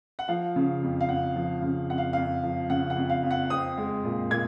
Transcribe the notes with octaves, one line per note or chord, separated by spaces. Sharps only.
F#5
F3 F5
C#3
F2
F5
F2 F#5
F3
C#3
F2 F#5
F5
F2 F5
F3
C#3 F#5
F#5
F2
F5
F2
F#5
C4 D#6
G#3
A#2
A#2 G#6